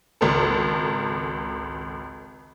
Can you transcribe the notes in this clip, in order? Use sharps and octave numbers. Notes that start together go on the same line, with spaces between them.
G#1 C#2 A4